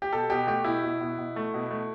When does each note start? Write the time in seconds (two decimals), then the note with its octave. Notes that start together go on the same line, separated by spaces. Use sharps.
0.02 G4
0.12 B2 A4
0.30 B2 G4
0.47 A3 G4
0.64 B2 E4
0.83 B2
1.01 B2
1.18 B2
1.36 A3
1.54 B2
1.71 A3